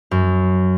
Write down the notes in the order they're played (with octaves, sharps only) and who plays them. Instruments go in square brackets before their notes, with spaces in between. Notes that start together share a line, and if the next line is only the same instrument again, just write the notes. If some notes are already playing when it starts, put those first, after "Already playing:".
[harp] F#2